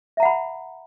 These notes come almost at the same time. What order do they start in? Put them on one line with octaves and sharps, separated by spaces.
E5 A#5 F#5 B5